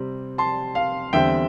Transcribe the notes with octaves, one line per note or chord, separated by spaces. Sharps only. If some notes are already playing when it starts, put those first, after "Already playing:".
Already playing: C3 G3 C4
A5 C6
F5
E2 D3 G3 C4 E5 G5